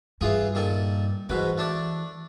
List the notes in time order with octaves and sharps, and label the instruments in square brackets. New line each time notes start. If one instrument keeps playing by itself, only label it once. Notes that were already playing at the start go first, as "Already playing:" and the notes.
[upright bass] G2 [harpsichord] E3 F4 G#4
[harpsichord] A#2 D#3 A4
[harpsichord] G#2 B2 B4 [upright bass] E3
[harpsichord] A3 D4 D5